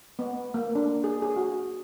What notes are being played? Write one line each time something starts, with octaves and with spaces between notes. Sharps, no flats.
B3
A#3
D4
G#4
G#4
F#4